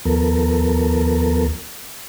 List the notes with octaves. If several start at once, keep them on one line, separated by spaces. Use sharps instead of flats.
D#2 F3 B3 A4 A#4